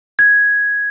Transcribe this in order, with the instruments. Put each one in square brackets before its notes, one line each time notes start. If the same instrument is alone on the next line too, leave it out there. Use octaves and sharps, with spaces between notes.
[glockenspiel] G#6